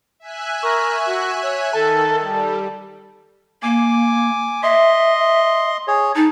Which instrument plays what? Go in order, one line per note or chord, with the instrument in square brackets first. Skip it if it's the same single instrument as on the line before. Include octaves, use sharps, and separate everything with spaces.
[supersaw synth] E5 G#5 F#6
[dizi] A#4 [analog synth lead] C#6
[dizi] F#4
C#5
[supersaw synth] D#3 [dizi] A4 [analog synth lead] A5
[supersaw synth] G3 [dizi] A4
[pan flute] A#3 [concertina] G#5 D6
[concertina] D#5 C6 [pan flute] E5
[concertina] G#4 C#5
[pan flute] D#4 [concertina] A5